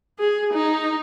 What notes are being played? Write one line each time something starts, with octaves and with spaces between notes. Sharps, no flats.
G#4
D#4